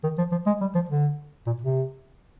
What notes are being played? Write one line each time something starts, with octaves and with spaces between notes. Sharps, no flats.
D#3
F3
F3
G#3
G3
F3
D3
A#2
C3